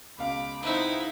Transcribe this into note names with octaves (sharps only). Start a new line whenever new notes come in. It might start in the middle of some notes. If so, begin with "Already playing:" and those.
C#2 B2 F5 B5 D6
B3 C4 D#4 E4 E5